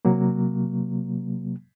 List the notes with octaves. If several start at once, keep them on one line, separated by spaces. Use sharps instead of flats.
C3 F#3 A#3